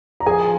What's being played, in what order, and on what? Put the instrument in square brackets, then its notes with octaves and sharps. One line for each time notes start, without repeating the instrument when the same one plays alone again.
[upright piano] A#5
[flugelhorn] F3 [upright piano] G#4 G#5